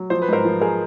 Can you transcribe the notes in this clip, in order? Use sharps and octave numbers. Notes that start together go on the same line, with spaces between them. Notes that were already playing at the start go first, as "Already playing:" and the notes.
Already playing: F#3
F3 C5
B4
G#2 A#4 C5
F3
G#4 A#4